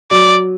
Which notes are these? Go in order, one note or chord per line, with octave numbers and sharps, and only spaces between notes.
F#3 D5